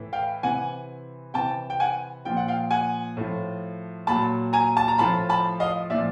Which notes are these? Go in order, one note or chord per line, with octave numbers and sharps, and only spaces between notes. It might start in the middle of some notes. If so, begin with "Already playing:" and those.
Already playing: A2 E3
F5 G5
C3 E3 F#5 G#5
C3 E3 G5 A5
G5
F#5 G#5
A#2 F3 G5
F#5
F5 G5
F#5 G#5
A2 F3
A#2 F#3 A5 B5
G#5 A#5
A5
A#5
A2 F3 A5 B5
A5 B5
D#5 F5
A#2 F3 D5 E5